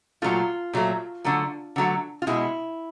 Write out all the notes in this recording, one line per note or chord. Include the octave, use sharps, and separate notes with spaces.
A#2 F#3 A3 F4
A#2 F#3 A3
D3 F#3 A3
D3 F#3 A3
F4
B2 G#3 E4